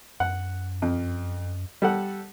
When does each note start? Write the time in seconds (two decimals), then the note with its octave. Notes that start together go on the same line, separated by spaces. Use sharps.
0.20 F#2 F#5
0.82 F2
1.82 G3 A4 F#5